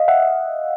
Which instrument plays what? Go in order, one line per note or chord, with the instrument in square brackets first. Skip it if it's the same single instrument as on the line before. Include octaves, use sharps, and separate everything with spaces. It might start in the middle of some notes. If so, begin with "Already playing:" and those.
Already playing: [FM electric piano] D#5 F5
E5 F#5